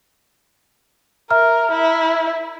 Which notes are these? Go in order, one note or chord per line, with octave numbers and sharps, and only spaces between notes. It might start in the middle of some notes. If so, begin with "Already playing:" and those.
A#4 E5 A#5 F6
E4